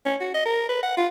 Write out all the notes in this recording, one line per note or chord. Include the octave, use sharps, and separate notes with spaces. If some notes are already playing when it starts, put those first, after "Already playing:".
C#4
F#4
D#5
A#4
B4
F#5
F4